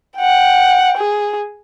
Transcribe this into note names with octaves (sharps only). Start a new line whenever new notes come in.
F#5 G5
G#4